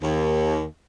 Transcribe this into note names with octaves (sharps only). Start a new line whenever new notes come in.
D#2